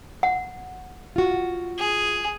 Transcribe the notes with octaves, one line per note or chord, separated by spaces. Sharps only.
F#5
F4 F#4
G#4